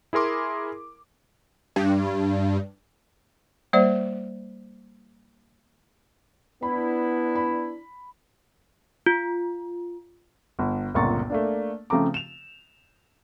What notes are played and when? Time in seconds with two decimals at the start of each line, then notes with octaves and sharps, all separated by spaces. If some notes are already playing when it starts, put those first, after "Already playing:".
0.13 E4 G#4 A#4 C6 D6
1.76 G2
3.73 G3 A#3 C5 D5
6.63 B3 D4 E4 B5
7.36 B5
9.06 F4
10.59 G1
10.94 G1 C#2 A#2 A#5 C#6 A6
11.30 A3 A#3 D4
11.90 C#3 F3 A3 C4 A#5 D6
12.14 E7 F7